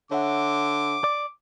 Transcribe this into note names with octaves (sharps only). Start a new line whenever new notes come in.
D3 C#5 E5 F#5 D6
D5